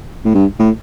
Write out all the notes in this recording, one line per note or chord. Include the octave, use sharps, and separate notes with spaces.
A2
G2
A2